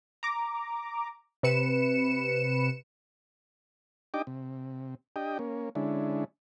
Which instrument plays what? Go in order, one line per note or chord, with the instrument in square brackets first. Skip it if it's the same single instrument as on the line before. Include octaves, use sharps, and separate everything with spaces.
[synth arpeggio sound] A#5 D6
C3 B4 C#7 E7
[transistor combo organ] D4 D#4 G4 D#5 G5 D6
C3
D4 G4 D#5 G5
A#3 C#4
D3 G#3 C#4 D4 E4